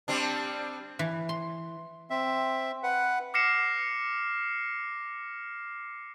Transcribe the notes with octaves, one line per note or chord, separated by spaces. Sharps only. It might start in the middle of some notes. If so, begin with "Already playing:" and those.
G3 C4 D4
E3
C6
C4 E5
B4 F#5
D6 F6 A#6 C7 C#7 E7